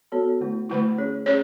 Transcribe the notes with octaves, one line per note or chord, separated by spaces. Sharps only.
B3 F#4 A4 C#5
D3 A3 E4
D3 A3 E4
C#4 G#4 C#5
C#4 G#4 C#5